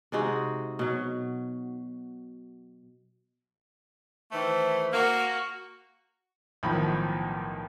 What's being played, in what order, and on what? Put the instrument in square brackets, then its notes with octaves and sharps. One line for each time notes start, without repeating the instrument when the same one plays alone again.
[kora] C3 G#3 D#4 F#4
B2 F#3
[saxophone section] D#3 E3 A3 [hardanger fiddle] C5
[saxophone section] A#3 [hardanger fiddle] F#4
[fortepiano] B1 A2 D#3 F3 B5